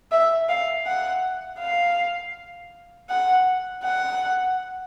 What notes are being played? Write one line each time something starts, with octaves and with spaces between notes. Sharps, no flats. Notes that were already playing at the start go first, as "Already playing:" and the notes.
E5
F5
F#5
F5
F#5
F#5